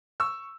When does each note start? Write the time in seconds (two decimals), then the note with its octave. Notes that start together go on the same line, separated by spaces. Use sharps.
0.20 C#6 E6